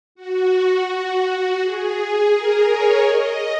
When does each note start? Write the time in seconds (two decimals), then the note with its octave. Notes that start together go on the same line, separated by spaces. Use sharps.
0.15 F#4
1.59 G#4
2.29 A#4
2.66 C#5
3.01 D#5